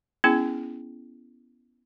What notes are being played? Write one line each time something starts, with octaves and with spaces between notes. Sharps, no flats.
B3 C#4 E4 G#4